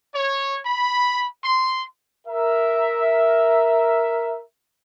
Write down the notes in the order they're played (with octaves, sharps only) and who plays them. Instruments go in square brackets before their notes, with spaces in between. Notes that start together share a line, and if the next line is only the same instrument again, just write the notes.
[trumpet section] C#5
B5
C6
[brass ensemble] A#4 E5